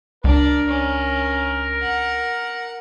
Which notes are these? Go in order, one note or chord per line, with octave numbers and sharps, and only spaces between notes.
C#2 D4 A#4
C#4
F#5